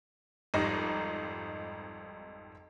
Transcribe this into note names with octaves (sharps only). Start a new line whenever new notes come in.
G#1 F2 G3 D#4 A#6